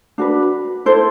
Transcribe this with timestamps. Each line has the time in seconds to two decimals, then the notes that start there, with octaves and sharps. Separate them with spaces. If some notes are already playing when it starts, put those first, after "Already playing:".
0.18 D4 F#4 B4
0.86 E4 A4 C5